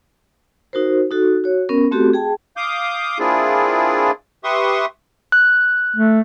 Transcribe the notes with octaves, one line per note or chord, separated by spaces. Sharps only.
D#4 F#4 A#4 C5
D#4 F#4 A4
F#4 C#5
B3 C#4 A#4
A3 C4 F#4 G4 A4
G#4 G5 A5
F5 D6 D#6 G6
A#3 C4 D4 E4 F4 G#4
G4 B4 E5 C6 C#6 D#6
F#6
A3